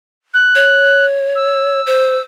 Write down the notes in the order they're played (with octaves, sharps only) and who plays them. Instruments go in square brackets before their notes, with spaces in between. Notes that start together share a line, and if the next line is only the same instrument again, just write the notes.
[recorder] F#6
[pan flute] C#5
[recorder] E6
[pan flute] C5